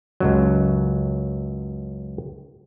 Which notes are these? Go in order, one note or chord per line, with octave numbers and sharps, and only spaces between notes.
C#2 F#2 F#3